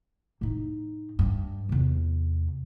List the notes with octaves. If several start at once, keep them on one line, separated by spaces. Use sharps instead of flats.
A2 D#4
G2
E2 C3